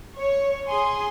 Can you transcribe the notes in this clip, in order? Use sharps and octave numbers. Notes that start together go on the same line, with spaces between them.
C#5
G#4 G#5 C6